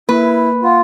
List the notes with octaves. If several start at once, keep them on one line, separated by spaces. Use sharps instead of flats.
A#3 E4 B4
F4 F#5